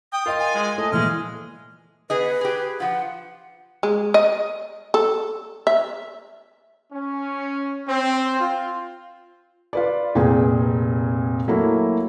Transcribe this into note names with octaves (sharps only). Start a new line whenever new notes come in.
G5 D#6
F4 A#4 D#5 C6
G#5
G#3
A3 D#5
A#2 E3 F3 G#3 F6
B3 G#4 B4 D#5
G4 G#4
F3 F4 F#5
G#3
D#5
A4
E5
C#4
C4
F4
F4 B4 D5
F1 A#2 C4 G#4 G5
F#3 A3 A#3 E4